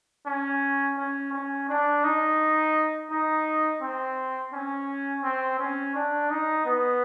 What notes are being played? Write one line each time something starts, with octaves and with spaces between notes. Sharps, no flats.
C#4
C#4
C#4
D4
D#4
D#4
C4
C#4
C4
C#4
D4
D#4
B3